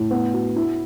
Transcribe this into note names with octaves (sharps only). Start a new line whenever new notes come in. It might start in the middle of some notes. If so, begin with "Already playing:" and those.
Already playing: A2
B3
F#4
E4